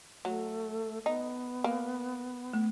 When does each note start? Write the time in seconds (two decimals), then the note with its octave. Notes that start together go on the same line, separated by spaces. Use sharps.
0.25 F#3 A3
1.06 B3 D#4
1.64 A#3
2.53 A3